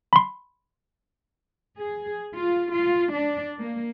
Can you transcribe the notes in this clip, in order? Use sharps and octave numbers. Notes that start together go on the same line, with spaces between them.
B5 C6
G#4
F4
F4
D4
A#3